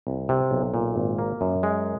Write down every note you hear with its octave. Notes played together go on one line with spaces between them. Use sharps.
C2
C3
B1
A#2
G#1
A#3
F#2
G#3